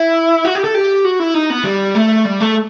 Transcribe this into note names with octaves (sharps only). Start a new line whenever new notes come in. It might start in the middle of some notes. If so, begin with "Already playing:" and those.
Already playing: E4
F#4
G4
A4
G4
F#4
E4
D#4
B3
G3
A3
G3
A3